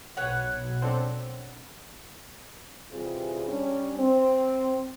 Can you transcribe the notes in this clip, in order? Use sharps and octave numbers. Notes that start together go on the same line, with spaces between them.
B1 B4 C#5 F#5
C4 D4 A4
C3 E3 G3 F4 G#4
G3 C#4 D4
C4